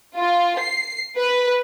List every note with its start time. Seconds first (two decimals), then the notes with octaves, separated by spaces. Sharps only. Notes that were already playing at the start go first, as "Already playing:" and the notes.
0.16 F4
0.59 C7
1.18 B4